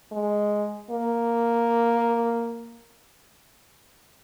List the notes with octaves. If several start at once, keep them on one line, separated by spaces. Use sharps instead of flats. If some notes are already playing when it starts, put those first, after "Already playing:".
G#3
A#3